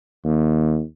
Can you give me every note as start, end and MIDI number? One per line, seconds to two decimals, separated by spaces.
0.25 0.82 39